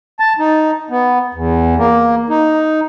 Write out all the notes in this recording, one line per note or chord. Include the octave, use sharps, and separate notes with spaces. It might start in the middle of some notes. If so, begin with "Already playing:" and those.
A5
D#4
B3
E2
A#3
D#4